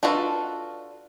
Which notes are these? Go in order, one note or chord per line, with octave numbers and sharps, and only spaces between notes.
D4 F4 F#4 A4 B4